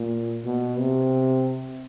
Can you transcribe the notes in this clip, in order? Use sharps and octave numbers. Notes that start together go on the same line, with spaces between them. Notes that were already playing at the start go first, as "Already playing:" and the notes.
Already playing: A#2
B2
C3